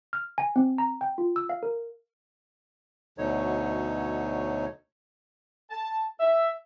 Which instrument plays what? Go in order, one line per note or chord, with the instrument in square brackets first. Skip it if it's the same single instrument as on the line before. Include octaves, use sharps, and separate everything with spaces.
[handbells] F6
G#5
C4
A#5
G5
F4
E6
F5
A#4
[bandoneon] D2 B2 D3 F#3 D#4 C#5
[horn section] A5
E5